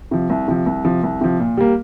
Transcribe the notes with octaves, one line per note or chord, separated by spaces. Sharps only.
C3 F3
C2
C3 F3
C2
C3 F3
C2
C3 F3
A#2
G3 A#3